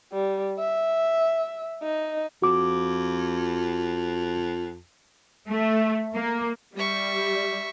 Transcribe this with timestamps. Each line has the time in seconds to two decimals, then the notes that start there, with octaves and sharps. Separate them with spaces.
0.13 G3
0.59 E5
1.83 D#4
2.42 F2 F#4 D6
5.46 A3
6.14 A#3
6.77 G3 E5 C#6